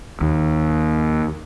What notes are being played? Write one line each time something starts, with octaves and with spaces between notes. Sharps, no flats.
D#2